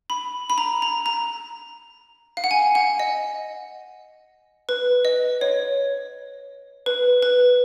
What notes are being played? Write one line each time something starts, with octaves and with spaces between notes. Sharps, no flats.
B5
B5
A#5
A#5
A#5
F5
F#5
G#5
F#5
D#5
B4
D#5
C#5
B4
B4